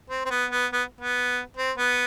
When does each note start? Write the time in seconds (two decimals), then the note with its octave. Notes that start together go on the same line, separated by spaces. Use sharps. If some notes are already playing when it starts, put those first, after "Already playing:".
0.10 C4
0.25 C4
0.30 B3
0.51 B3
0.73 B3
1.01 B3
1.57 C4
1.78 B3